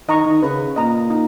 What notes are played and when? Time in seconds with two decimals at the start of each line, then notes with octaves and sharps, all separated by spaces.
0.08 D#3 D#5 A#5 C#6
0.26 D#3
0.42 C#3 B4
0.76 A#2 D#5 A#5
1.10 D#4